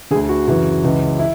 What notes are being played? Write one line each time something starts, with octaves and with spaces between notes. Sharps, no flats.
D2 D3 G#4
F#4
F#2 C#3 E3 F#4
C#2 C#3 E3
E4